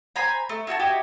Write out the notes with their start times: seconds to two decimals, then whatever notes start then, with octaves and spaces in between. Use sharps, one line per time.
0.16 C5 G#5 A#5 B5
0.49 A3
0.67 E4 F#4 G5 A5
0.79 E4 F#4 G4 D#5